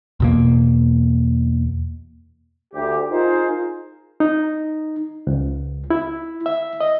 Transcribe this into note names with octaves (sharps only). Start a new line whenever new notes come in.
E2 B2 A#3
D2 G4
D#4 F4 G#4 A#4 C5
D#4
C#2
E4
E5
D#5